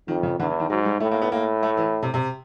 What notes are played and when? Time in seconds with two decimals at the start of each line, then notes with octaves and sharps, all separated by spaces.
0.08 F2 D#3
0.23 C#3
0.39 E2 D3
0.49 E3
0.60 D#3
0.70 G#2 F#3
0.85 G3
1.00 A2 A3
1.11 A#3
1.22 B3
1.32 A2 A#3
1.63 A3
1.77 E3
2.03 C3
2.14 C3